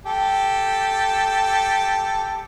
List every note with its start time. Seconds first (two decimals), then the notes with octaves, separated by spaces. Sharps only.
0.05 G4 A4